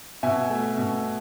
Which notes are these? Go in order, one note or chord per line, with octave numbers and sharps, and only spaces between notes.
B2 E5 G#5
A3
B2